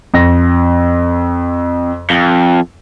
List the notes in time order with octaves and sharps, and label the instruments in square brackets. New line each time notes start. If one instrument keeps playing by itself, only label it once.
[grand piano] F2 A#6
[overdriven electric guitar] F2